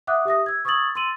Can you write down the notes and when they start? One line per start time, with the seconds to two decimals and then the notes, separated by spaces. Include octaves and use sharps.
0.07 E5 F#5 D6 D#6 F#6
0.25 G4 E5 D#6 A#6
0.46 E6 G#6
0.65 C#6 D#6 E6 G#6 A6 F#7
0.95 C6 E6 A6 D#7 F#7